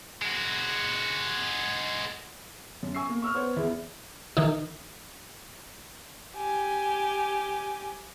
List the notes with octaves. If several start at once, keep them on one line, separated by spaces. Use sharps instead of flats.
G#3 F#4
F#2
G#5 C#6 E6 C7
A#3
C#6 E6 F6
B3 C5 C#5
E2 E4 G#4
D#3 E3 D#4
G4 G#5